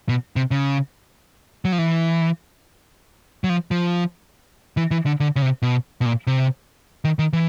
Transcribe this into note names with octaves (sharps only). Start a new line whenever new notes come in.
B2
C3
C#3
F#3
F3
E3
F#3
F3
F3
E3
E3
D3
D3
C#3
C3
B2
B2
A#2
C3
D#3
D#3
E3